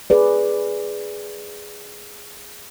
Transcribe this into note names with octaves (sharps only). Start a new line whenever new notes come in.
G#4 B4 D5